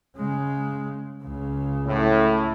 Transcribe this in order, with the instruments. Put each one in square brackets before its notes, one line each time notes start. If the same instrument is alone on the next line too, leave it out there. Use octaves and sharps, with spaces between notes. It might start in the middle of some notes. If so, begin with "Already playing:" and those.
[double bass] C#3 G#3
C#2 C#3
[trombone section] A2